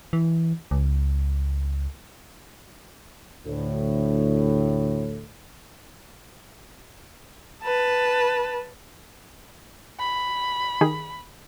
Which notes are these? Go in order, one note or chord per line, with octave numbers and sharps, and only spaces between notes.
E3
C#2
D2 A2
B4 A5
B5
D#3 G4 G#4